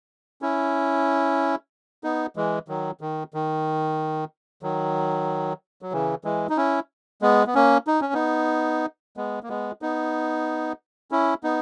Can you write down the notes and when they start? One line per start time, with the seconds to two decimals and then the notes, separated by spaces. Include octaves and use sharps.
0.42 C#4 E4
2.04 B3 D#4
2.36 E3 G#3
2.68 D#3 F#3
3.01 D#3
3.34 D#3
4.62 D#3 F#3
5.82 F#3
5.92 C#3 E3
6.24 E3 G#3
6.49 D#4
6.57 C#4 E4
7.22 G#3 B3
7.47 B3
7.55 A#3 C#4
7.87 D#4
8.01 C#4
8.13 B3 D#4
9.17 G#3 B3
9.43 A#3
9.49 G#3 B3
9.82 B3 D#4
11.11 C#4 E4
11.44 B3 D#4